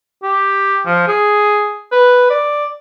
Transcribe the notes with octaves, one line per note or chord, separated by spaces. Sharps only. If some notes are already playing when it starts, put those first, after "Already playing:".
G4
F3
G#4
B4
D5